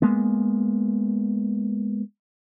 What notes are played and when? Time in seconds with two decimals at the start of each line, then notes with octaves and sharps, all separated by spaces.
0.02 G#3 A#3 B3